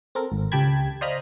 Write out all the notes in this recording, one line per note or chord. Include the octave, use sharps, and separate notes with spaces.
C4 A4 A#4
G#1
C#2 G4 G5 A5 B5 G#6
C5 D5 D#5 F5 A#5 B5